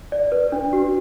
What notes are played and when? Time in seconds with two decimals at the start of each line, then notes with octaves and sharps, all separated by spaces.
0.12 D5
0.32 B4
0.52 D4
0.73 F#4